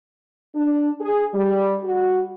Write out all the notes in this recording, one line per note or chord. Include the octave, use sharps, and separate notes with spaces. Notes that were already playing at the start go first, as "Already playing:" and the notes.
D4
G#4
G3
F#4